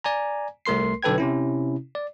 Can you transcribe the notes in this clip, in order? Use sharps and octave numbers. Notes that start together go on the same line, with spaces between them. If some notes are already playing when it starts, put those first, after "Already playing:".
D5 G#5 A#5
C2 A3 A#4 C6 C7
B1 D3 A4 B4 G5 G#6
C3 C#4 E4
D5